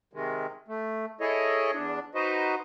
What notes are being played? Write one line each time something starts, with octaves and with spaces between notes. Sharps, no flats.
C3 D#3 G#3
A3
E4 G#4 A4 C#5 D#5
E2 D4
D#4 F#4 B4 C5 D#5